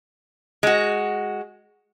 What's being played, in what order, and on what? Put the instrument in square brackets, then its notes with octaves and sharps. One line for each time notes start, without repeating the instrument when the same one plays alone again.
[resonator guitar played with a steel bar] G#3 F#4